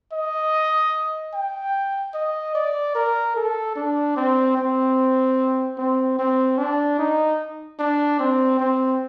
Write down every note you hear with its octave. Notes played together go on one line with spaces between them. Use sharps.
D#5
G5
D#5
D5
A#4
A4
D4
C4
C4
C4
C4
D4
D#4
D4
C4
C4